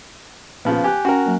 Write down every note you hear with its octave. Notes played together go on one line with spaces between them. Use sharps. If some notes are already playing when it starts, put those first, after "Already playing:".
A#2 C#3 F3 B3
G4 G#5 F#6
C#4 F#4 A#4 G5
F#3 A#3